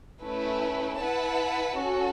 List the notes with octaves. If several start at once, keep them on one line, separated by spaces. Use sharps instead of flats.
A3 C#4 E4 B4
E4 B4 F#5 A5
C#4 F#4 A4